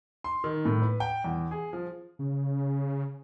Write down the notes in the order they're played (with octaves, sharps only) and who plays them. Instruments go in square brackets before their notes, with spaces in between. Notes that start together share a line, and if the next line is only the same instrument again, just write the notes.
[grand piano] C6
D#3
A2
B4
G5
E2
G#4
F3
[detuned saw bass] C#3